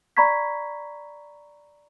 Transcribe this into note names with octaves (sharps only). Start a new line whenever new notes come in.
D5 A#5 B5 C#6 G#6 B6